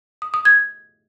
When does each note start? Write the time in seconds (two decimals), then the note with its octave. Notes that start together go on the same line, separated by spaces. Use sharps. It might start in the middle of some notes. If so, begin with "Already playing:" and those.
0.22 D#6
0.34 D#6
0.45 G#6